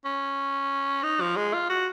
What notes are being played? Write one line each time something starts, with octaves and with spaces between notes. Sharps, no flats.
C#4
D#4
F3
G#3
F4
F#4